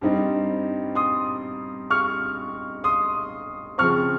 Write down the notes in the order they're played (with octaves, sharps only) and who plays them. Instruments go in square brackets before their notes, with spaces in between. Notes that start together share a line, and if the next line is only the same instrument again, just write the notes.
[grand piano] G2 G3 C4 D#4
C6 D#6
C#6 F6
C6 D#6
C#3 F3 C4 C#6 F6